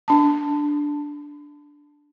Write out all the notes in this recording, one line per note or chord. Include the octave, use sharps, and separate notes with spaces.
D4 A5